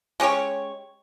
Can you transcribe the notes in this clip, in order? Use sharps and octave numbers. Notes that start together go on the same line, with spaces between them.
G#3 C#4 G4 C#5